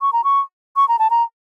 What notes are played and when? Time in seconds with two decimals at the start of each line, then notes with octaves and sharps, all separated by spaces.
0.01 C#6
0.13 A#5
0.24 C#6
0.76 C#6
0.88 A#5
0.99 A5
1.10 A#5